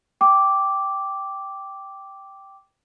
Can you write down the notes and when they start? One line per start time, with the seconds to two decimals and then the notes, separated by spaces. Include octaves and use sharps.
0.21 G5 D6